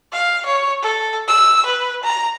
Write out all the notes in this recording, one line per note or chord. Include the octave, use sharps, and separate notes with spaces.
F5
C#5
A4
E6
B4
A#5